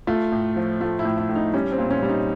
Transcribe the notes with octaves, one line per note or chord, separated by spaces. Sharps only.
A3 F4
A2
F3
A3 F4
E4
A2
E4
A2
D#4
G3 C#4
C4
A#2
C#4
G3
D#4